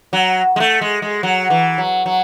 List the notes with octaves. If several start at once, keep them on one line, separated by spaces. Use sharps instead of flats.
F#3
G#3
A3
G#3
G#3
F#3
E3
F#3
F#3